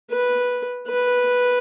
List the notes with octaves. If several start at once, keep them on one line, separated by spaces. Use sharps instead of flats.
B4
B4